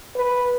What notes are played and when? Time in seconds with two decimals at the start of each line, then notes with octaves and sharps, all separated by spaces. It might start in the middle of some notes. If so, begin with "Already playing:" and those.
0.17 B4